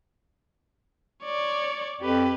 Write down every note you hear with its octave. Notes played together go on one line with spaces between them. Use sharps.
C#5 D5
F2 G4 B4